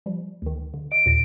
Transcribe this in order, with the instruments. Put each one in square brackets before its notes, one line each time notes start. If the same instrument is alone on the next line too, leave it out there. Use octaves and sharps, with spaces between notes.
[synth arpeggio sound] F3 G3
D2 D#3
D3
[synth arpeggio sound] D#5 [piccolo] D7
[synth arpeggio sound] D#2 A#2 A#6